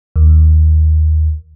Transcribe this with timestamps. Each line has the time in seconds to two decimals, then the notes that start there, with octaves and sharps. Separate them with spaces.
0.16 D#2